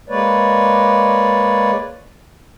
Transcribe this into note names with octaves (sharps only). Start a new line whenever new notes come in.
G#3 A#3 B4 C#5 D5